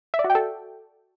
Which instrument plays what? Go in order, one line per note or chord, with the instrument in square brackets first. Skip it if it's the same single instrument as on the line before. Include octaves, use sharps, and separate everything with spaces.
[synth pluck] E5
D5
F#4
G5
A4